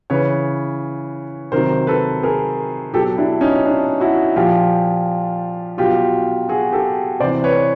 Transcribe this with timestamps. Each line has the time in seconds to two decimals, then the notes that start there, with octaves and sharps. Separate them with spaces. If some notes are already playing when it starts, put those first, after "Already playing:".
0.10 C#3 E3 B4 C#5
1.52 C3 D#3 F#3 A#4 C5
1.87 A4 B4
2.23 G#4 A#4
2.94 B2 F#3 G4 A4
3.17 D4 E4
3.41 C#4 D#4
3.66 D4
4.00 E4 F#4
4.36 A#2 F3 F4 G4
5.78 B2 F#3 F4 G4
6.49 F#4 G#4
6.72 G4 A4
7.20 C3 C5 D5
7.24 E3
7.44 B4 C#5